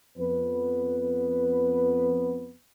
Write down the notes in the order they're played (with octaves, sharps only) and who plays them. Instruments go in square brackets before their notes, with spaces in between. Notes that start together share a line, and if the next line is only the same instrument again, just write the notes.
[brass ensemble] F2 B3 B4